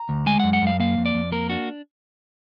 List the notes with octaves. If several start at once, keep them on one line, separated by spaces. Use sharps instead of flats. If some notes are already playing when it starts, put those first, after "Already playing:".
Already playing: A#5
D2
G#3 G#5
F#2 F#5
F#5
F#2
F5
A#3 F5
F2
D5
F2
A#3 A#4
D4 F#4